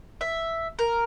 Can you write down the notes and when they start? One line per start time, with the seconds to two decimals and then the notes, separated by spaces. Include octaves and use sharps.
0.21 E5
0.79 A#4